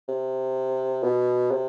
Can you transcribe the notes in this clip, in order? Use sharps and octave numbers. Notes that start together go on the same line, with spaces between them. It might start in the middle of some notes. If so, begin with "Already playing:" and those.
C3
B2
C3